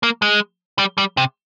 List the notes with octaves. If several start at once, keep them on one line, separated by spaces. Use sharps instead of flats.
A#3
G#3
G3
G3
C3